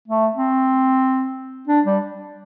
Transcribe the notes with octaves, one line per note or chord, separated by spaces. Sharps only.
A3
C4
D4
G3